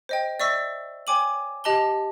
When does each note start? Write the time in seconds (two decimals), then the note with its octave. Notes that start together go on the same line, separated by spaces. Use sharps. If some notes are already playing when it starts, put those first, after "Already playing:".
0.09 C5 D#5 G5
0.40 D5 E5 C#6 E6 A#6
1.07 C#5 G5 G#5 D6 D#7 F#7
1.64 G4 D#5 A5 F#7 G7